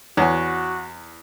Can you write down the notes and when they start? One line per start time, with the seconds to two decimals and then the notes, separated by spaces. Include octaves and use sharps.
0.17 E2 F#4 C#5 F#5 G#5